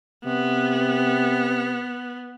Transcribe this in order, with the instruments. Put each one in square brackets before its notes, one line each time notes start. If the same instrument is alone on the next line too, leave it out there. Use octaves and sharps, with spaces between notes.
[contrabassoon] C3 [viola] B3